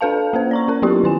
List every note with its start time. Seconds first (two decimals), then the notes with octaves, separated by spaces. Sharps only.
0.01 D4 A4 B4 F5 A5
0.33 A#3 C#4 C5
0.51 D5 A#5 C#6
0.68 C#4 A#4
0.82 F#3 B3 E4 F4 G4
1.04 D#3 E4 G#5